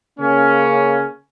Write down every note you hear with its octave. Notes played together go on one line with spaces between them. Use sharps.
C#3 A#3 C#4